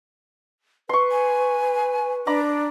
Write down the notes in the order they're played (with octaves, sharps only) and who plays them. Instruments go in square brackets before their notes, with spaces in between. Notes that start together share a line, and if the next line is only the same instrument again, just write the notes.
[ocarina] B4 [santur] C6 C#6
[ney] G#5
[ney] D4 [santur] A#5 B5 D6